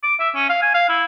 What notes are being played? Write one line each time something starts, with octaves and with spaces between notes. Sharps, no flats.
D6
E5
C#4
F5
G#5
F5
E4